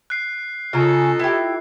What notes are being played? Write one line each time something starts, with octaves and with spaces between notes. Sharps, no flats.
F#6 C7
C#3 C#4 D#4 F4 A4 A#5
E4 G4